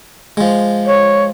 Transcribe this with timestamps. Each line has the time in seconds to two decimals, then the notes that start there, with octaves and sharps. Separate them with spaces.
0.37 F3 G#3
0.86 C#5